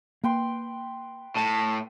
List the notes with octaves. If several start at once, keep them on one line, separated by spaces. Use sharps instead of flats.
A#3 B4 G5 C6
A2 A5